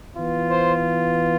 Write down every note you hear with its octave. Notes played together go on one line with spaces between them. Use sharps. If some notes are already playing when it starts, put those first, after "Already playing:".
E3 B3 F4
C5